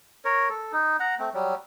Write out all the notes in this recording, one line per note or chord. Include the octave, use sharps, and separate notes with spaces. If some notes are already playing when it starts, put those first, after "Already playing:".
A#4 C#5
A4
D#4
F#5 A#5
A3 C4
F#3 G3